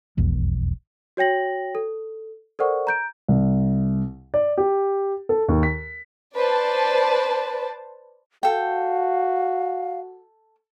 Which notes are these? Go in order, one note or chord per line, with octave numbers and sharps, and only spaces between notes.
E1 B1 F2
F#4 C#5 G5 A#6 F#7
A4
A4 A#4 C5 D5 F#5 C#6
A#5 G6 D7
C2
D5
G4
A4
D#2
B6
B4 C5 D5 A5
F#4 A4 F5 G5